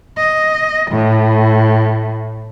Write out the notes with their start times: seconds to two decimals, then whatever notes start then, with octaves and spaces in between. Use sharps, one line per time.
0.17 D#5
0.91 A2